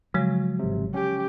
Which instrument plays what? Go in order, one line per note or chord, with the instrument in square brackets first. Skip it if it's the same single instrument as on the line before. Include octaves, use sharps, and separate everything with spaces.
[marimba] C#3 F3 G#3 [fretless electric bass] F#3
[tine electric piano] G#1 C3
[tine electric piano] C#4 [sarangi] G4